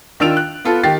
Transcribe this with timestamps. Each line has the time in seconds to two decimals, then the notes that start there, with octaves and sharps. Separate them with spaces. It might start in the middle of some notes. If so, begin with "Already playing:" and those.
0.20 D#3 D4 F4 E6 D7 F7
0.37 F#6
0.65 B3 F4 A4
0.83 D#3 G4 A6 C7